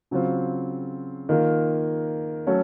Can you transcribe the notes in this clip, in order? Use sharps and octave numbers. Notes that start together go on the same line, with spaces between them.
C#3 F#3 C4 F4 C5
D#3 A#3 F4 A#4
F#3 A3 C#4 A4 C#5